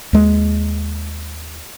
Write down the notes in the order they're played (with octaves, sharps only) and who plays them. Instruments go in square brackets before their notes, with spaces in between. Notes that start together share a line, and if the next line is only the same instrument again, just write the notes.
[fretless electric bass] D#2 G#3